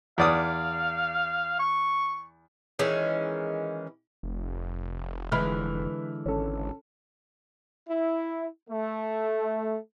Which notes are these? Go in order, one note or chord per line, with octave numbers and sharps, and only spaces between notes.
E2 D5 F5 D#6
C#6
D#3 E3 G#3 C#4
F1
D3 E3 G#3 B4 B5 F6
G#1 C#4 A4
E4
A3